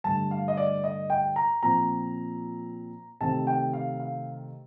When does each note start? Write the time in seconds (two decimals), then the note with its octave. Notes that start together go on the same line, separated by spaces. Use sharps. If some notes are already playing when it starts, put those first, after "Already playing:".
0.04 G2 D3 A3 A5
0.31 F5
0.48 D#5
0.57 D5
0.84 D#5
1.10 G5
1.36 A#5
1.63 A#2 F3 C4 A#5
3.21 C3 D#3 A3 C4 A5
3.47 G5
3.73 F5
4.00 F5